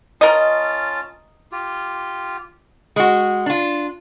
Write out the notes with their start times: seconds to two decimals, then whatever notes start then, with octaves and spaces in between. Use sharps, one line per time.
0.21 C#4 F4 A#4 D#5 A5
1.52 F4 G4
2.96 G#3 F#4
3.46 D4 F4